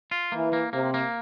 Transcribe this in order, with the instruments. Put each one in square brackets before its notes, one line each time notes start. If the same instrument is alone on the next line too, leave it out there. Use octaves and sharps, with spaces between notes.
[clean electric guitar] F4
[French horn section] E3 [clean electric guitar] A#3
[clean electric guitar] A#3
[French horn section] C3 [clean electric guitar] A#3
[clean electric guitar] A#3